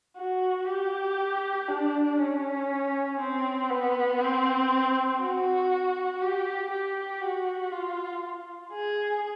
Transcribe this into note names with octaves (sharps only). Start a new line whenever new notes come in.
F#4
G4
D4
C#4
C4
B3
C4
F#4
G4
G4
F#4
F4
G#4